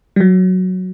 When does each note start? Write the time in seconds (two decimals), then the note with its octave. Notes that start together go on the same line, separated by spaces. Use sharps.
0.16 G3
0.20 F#3